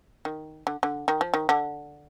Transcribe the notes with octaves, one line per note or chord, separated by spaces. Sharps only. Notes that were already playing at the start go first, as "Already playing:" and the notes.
D#3
D3
D3
D#3
F3
D#3
D3